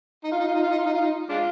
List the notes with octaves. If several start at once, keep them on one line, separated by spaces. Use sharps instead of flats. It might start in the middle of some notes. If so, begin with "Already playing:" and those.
D#4
F4
D#4
F4
D#4
F4
D#4
F4
D#4
F4
D#4
G#3 D4 F4